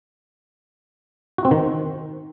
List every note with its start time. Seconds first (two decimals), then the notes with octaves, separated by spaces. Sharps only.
1.38 F#4
1.45 C4
1.51 D#3